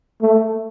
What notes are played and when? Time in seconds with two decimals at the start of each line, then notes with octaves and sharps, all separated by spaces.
0.22 A3